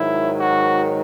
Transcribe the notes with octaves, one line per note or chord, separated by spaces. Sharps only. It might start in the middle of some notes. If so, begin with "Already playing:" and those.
Already playing: G#2 D#3 F#3 E4
F#4